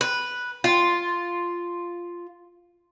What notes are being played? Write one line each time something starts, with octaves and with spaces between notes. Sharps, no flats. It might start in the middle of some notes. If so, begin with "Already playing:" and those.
B4
F4